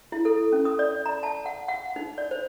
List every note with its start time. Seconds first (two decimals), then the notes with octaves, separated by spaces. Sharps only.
0.12 E4
0.25 A4
0.52 C#4
0.65 D#6
0.79 D5
1.06 A#5
1.23 A5
1.46 F#5
1.68 F#5
1.96 D#4
2.18 D5
2.31 C5